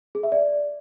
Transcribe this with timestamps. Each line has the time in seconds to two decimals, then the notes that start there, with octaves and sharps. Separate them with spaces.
0.15 G#4
0.23 E5
0.32 D5